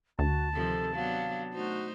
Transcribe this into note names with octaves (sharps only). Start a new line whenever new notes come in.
D2 F#4 A5
C3 D#3 F3 A4
F#3 B3 D4 F5
A3 D#4 F#4 C5